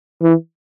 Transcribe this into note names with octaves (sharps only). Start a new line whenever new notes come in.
E3